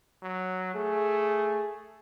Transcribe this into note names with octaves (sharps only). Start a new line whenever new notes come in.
F#3
A3 G#4